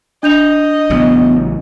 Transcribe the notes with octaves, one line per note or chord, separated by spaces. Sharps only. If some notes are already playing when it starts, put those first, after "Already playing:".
D4 D#5 G6 F7
A1 C#3 F#3 B3